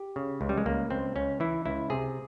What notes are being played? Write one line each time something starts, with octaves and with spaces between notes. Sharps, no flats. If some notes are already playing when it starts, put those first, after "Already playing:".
Already playing: G4
C#3
C#2
G3
G#3
C#2 A#3
C#2 C4
C#2 C#4
E3 E4
C#2 E4
C3 G#4